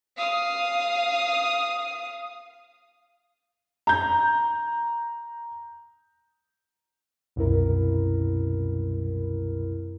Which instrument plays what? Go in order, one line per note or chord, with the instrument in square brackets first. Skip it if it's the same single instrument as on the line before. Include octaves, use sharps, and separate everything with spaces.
[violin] F5 D#6
[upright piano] A#5 G6
[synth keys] C2 F#2 B2 E4 A#4